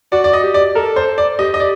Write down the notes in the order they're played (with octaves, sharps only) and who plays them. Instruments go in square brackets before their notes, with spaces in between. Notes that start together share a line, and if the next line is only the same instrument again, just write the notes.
[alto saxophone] F#4 [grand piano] D5
[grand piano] D5
D#5
[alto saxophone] G4
[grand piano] D5
[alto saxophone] A4 [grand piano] A#4
[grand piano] C5
D5
[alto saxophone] G4 [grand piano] D#5
[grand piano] D#5
D5